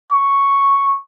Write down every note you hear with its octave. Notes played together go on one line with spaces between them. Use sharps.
C#6